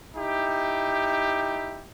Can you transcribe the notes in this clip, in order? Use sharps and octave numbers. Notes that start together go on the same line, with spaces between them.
D#4 E4 G4